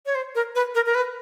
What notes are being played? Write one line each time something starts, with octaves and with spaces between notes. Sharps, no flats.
C#5
C5
A#4
B4
A#4
A#4
B4